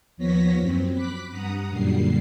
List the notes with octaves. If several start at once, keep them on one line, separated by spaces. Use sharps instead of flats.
D#2 F3 B3 C#5 A#6 B6
F#2 C4
B5 D6 F#6 B6
G2 F#5 A#5 D#6
F#2 A#2 D3 G3 C7